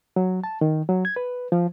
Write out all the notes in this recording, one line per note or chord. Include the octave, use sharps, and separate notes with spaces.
F#3
A5
D#3
F#3
G#6
B4
F3